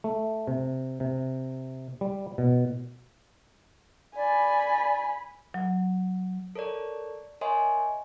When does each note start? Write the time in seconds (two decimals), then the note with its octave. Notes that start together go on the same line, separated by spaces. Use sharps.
0.04 A3
0.47 C3
1.00 C3
2.01 G3
2.38 B2
4.16 D5 G#5 B5
5.54 F#3
6.55 A4 A#4 C#5 D5
7.41 A#4 C#5 D#5 E5 G#5 C6